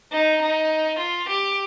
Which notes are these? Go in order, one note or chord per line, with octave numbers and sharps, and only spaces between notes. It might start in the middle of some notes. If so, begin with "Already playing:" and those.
D#4
D#4
F4
G4